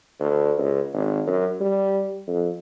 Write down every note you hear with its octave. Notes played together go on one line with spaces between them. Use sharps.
D2
C#2
G#1
F#2
G3
F2